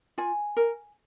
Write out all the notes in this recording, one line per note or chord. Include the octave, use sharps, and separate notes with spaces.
F4 G#5
A#4